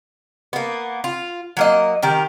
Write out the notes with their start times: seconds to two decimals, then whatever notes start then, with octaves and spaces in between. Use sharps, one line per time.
0.53 A#3 B3
1.04 F4
1.57 F#3 A#3 D#5
2.03 D#3 G4 A#4